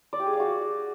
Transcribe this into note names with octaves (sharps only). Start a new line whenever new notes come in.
D5
G4
G#4
F5
F#4